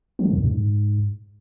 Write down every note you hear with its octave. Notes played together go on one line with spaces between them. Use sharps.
F3
D3
F2
E2
G#2